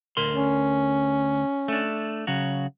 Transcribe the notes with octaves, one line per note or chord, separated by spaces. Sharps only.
D2 A#4 C6
C#4
A3 D4
C#3 F#3 F#4